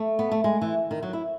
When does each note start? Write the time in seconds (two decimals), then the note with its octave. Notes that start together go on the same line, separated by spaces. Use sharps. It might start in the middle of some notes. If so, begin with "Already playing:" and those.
Already playing: A3
0.19 B3
0.32 A3
0.44 G#3
0.62 E3
0.91 D#3
1.03 F#3
1.13 E4